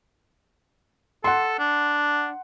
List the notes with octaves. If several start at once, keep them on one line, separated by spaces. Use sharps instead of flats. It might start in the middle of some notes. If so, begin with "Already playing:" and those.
A4 F#5 C6
D4